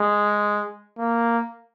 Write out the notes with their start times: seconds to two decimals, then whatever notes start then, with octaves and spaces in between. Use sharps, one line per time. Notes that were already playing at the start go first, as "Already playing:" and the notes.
Already playing: G#3
0.98 A#3